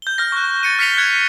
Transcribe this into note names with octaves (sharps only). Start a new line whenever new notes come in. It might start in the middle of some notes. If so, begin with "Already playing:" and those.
G6 G7
F6 G6 A#6
C#6 F#6
A6 C#7 D#7
F6 B6 C#7 F7 G7
F6 F#6 G#6 C#7